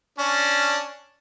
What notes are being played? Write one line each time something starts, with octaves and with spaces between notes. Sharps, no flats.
C#4 D4